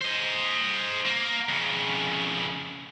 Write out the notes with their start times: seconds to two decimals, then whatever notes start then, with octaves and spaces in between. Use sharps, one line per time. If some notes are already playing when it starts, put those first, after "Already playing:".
0.01 C5 D#5
1.05 A#3
1.49 F2 C#3